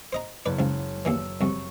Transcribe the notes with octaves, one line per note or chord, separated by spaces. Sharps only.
C5 D#5 A#5
F#1 B4 D5
C#2 F3
D#2 A#2 E3 E6
C2 F2 C#6